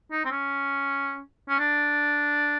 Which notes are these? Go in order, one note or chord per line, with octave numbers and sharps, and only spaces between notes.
D#4
C4
C#4
C#4
D4